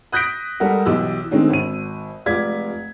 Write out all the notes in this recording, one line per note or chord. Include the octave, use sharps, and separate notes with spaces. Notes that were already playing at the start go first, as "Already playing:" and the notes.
D#6 F#6 G6 A#6 B6 D7
G3 G#3 A4 A#4 F#5
B1 E3 G4 E6
D3 D#3 G#3 C4 C#4 D#4
G#1 D#7
F1 G#3 F4 D5 G#6 B6